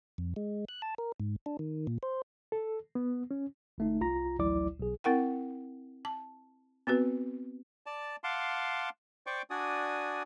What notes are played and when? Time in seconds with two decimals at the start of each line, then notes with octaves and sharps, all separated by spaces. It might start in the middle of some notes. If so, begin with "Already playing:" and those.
0.18 F2
0.36 G#3
0.69 F#6
0.82 A5
0.98 A#4
1.20 G#2
1.46 D4
1.59 D#3
1.87 A#2
2.03 C5
2.52 A4
2.95 B3
3.31 C#4
3.78 G1 A3 D#4
4.01 C2 F4 A#5 A#6
4.39 A1 D2 F#3 E4 D5 D6
4.80 B1 G#4
5.04 C4 E4 A#4 F#5 G5
6.05 A5
6.87 B3 C4 F#4 B4
7.86 D5 A5
8.24 F5 F#5 A5 C6 D6
9.27 C5 D5 G5 C#6 D6
9.50 D4 F#4 D5 G#5 D#6